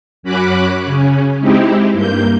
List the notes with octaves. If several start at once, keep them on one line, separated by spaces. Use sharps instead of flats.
F#2 C#4 F#4 B5 D6 F#6
C#3 C#4
G#3 C4 D#4 E4 G4
G2 A#3 G6